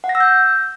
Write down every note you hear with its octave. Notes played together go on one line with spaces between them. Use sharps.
F#5
A#6
E6
G6